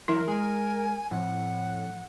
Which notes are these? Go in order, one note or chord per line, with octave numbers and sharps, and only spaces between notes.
F#2 E3 E4 A#4 E5
G#3 G#5
F2 A2 F#5